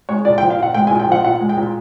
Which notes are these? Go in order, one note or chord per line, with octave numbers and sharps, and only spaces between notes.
G#3 C#5
A#2 D5
G5
F3
F5
A#2 F#5
G#3 G5
G#5
A#2
G5
F3 F#5
A#2 F#5
G#3
G5
A#2